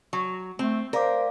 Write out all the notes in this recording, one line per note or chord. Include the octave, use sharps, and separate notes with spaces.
F#3
A3 C4
A#4 C5 D5 F5 D6